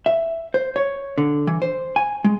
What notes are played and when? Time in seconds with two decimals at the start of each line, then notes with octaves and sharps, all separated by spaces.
0.06 E5
0.54 C5
0.76 C#5
1.18 D3
1.47 E3
1.62 C5
1.96 G#5
2.24 G#3